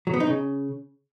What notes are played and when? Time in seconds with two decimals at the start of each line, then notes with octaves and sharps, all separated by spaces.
0.07 F#3
0.14 B3
0.20 D#4
0.27 C#3